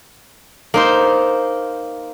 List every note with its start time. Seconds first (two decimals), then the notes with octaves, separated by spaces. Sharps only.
0.74 A#3 D#4 C5